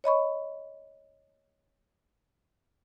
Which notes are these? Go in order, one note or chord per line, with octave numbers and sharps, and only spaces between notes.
C#5 D#5 B5 C#6